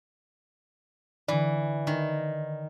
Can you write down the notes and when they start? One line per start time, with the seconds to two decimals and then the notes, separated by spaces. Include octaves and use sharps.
1.28 D3 E3 D5
1.87 D#3